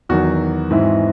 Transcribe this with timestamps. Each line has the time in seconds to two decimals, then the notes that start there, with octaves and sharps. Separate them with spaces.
0.09 E2 D#3 F#3 F#4
0.70 G#2 E3 C4 E4